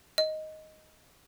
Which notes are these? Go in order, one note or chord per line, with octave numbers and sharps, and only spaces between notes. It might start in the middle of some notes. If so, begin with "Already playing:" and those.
D#5